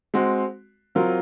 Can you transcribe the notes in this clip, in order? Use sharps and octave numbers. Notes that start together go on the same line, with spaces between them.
G#3 C4 F#4
F#3 C4 F4 A#4